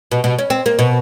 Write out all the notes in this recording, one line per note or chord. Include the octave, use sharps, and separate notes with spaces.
B2
B2
C#4
C4
A#3
B2